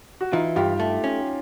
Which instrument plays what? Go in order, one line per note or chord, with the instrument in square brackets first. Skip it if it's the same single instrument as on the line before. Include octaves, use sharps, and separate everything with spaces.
[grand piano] F#4
[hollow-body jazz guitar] E3 [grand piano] D#4 F4
[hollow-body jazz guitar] G2 [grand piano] F4 G4
[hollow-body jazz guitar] A3
C#4